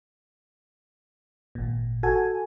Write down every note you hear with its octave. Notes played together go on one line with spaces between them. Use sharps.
G#1 A#2
F#4 A4 G#5